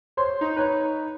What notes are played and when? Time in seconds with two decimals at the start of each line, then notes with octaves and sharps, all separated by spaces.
0.17 C5 C#5 C6
0.41 D#4
0.57 B4 C#5